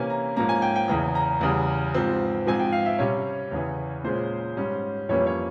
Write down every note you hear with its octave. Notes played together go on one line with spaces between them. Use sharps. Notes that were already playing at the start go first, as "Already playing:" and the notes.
Already playing: C3 E3 A#3 C#4 G#5
A#5
G#2 F3 A#3 C#4 A#5
G#5
G5
G5
E2 C#3 E3 A#5
A#5
E2 C#3 G3
G#2 F3 C4
G#2 F3 C4 G#5
G5
F5
E5
C3 G3 C#4 C#5
E2 C#3 E3
A#2 G#3 C#4 C5
G#2 G3 C#4
F2 E3 G3 A#3 C#4 C#5
C#5